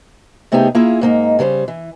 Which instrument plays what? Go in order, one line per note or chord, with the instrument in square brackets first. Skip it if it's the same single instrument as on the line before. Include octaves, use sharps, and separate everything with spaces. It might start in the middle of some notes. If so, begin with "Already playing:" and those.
[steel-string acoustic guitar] C3 A3 B3 D#4 G4 G#4
A#3 E4 F4 G#4 E5
G#2 A#3 D#4
C#3 G3 A#4 C5
E3